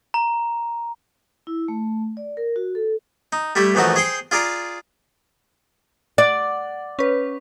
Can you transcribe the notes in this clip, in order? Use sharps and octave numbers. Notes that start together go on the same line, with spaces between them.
A#5
E4
A3
D5
A#4
F#4
A4
D#4
G3 A3 E4 G4
A#1 E3 A3 D#4 F#4 A5
G#4 C5 G5 C6
F4 G#4 D5 A#5 D6
D5 F#5
C#4 B4